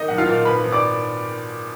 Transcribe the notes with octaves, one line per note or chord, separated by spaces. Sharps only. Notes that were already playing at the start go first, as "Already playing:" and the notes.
Already playing: D#3 A#3 D#4 D#5
B1 F#5
F4 F5
A#2
G#1 B4 B5
G#1
D5 D6